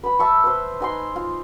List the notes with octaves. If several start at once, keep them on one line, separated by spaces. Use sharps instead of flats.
B4 B5
E5 A5 C#6
B4 C5
D#4 G#5 C6
F4